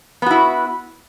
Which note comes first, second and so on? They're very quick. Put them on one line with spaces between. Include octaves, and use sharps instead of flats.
B3 F#4 E4